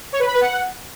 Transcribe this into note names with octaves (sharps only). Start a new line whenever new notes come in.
C#5
B4
B5
B4
F#5